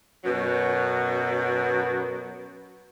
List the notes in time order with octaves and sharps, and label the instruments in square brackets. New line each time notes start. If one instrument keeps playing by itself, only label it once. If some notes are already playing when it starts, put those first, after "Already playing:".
[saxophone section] F#2 B2 F#3